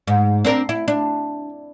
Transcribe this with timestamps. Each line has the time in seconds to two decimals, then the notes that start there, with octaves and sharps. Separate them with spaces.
0.07 G#2
0.45 C4 D4 A#4
0.69 E4
0.88 D4